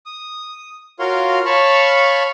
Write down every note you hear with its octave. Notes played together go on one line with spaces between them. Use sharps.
D#6
F4 F#4 A#4 C#5 F5 C6
C#5 F5 A5 B5 C#6